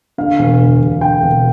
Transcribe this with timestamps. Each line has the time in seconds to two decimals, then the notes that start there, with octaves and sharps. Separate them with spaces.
0.18 D3 F5
0.39 E1
0.60 D2
0.81 E1
1.01 D3 G5
1.22 E1